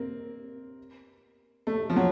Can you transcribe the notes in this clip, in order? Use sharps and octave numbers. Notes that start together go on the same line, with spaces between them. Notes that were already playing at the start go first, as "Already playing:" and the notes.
Already playing: A#3 C4
A3
F3
F#3